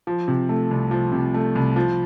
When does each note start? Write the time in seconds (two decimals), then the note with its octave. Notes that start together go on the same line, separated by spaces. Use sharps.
0.07 F3
0.28 C3
0.49 A3
0.71 C2
0.91 F3
1.12 C3
1.34 A3
1.55 C2
1.76 F3